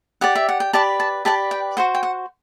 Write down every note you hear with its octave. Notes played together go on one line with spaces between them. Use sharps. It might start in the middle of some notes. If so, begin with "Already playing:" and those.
G4 D5 F#5
E5
F#5
G5
G4 B4 D5 A5
A5
G4 B4 D5 A5
G5
F#4 C5 F#5
G5
F#5